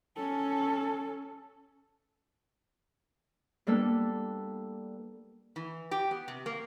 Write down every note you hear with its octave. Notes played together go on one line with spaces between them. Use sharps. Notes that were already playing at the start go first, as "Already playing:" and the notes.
C#4 A4
G3 A#3 B3 D4 A4
E3
G4
B3
C3
A#3